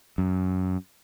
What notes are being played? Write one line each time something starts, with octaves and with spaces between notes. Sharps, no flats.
F#2